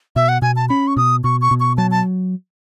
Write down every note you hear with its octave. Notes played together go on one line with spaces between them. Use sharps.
B2 E5
F#5
B2 G#5
A5
C#4 B5
C#6
B2 D#6
B2 C#6
C#6
B2
C#6
F#3 A5
A5